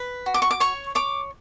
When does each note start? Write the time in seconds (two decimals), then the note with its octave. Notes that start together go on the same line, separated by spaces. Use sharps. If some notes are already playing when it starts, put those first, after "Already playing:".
Already playing: B4
0.26 F#4
0.34 D6
0.42 C#6
0.51 D6
0.60 C#5 C#6
0.95 C#5 D6